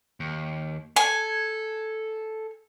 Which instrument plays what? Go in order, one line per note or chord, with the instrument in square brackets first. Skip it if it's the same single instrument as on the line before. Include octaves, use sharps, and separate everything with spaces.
[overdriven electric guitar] D#2
[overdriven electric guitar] A4 [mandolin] G#5